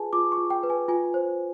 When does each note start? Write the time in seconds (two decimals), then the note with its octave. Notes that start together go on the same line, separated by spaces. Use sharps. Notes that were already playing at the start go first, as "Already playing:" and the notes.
Already playing: F4 G#4 B4 G#5 A5
0.13 F4 D6
0.32 C#6
0.38 F4
0.50 G5
0.63 B4
0.70 G#5
0.88 F4 G#5
1.14 C5